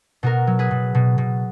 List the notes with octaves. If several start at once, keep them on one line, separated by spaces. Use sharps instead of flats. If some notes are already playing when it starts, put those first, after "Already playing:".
B2 F#4 A#4
F#3
G#4 B4
B2
B2
B2